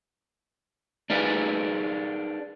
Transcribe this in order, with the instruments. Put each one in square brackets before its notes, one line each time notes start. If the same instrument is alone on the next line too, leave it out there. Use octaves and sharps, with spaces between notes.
[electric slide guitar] D4 D#4 G#4 B4 D5